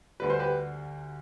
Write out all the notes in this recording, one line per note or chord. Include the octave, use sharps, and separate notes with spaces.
D2 D3 G3 B4
C5
G4 B4